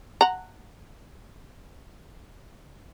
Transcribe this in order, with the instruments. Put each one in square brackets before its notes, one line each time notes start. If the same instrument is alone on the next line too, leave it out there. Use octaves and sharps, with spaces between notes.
[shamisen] F#5 A#5